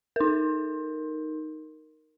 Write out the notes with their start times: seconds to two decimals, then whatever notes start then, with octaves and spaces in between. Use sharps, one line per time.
0.16 D#4 A#4